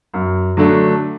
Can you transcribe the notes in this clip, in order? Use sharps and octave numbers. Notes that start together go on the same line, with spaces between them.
F#2
D3 F#3 A3 D4